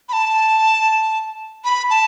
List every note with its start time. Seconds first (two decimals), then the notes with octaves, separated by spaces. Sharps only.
0.09 B5
0.13 A5
1.65 B5
1.90 A5